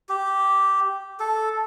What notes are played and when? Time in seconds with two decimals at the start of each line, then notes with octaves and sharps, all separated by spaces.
0.09 G4
1.20 A4